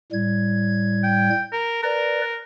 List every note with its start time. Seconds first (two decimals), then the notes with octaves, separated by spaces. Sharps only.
0.12 A2 G3 G#6
1.04 G5
1.53 A#4
1.83 A#4 B4 D5